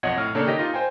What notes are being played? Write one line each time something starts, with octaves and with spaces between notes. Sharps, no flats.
B1 F2 C#5 D#5 F#5 G#6
A2 F6
C#3 A#3 D4 A4 C#5
D#3 G4 D#5 A#6
D#4 F4
C5 G5 G#5